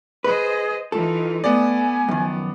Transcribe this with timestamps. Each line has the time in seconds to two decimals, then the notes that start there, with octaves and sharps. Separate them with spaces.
0.24 G#4 B4 C5 D#5
0.92 E3 D#4 F4 A4
1.44 A3 B3 D5 G#5
2.09 F#2 D#3 F3